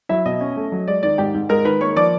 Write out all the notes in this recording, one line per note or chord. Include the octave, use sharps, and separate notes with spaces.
F#3 E4 E5
B2 D#5
C#4
A3
F#3
G#3 D5
D#3 D5
G#2 G4 G5
G#2
G#3 A#4 A#5
D#3 B4 B5
A#3 C#5 C#6
F3 D5 D6